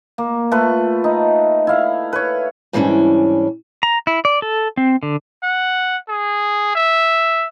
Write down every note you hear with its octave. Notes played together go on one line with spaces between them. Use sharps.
A#3
A3 F4 B4
D#4
E4 F5
B4 C#5
G#2 E3 G3 A#3 C#4 D4
A#5
E4
D5
A4
C4
D3
F#5
G#4
E5